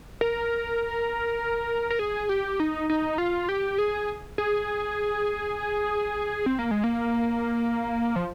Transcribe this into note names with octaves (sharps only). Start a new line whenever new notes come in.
A#4
A#4
G#4
G4
D#4
D#4
F4
G4
G#4
G#4
C4
A#3
G#3
A#3
F3